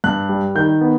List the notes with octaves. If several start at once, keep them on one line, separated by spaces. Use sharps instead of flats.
G2 F#6
G3
D#3 G6
B3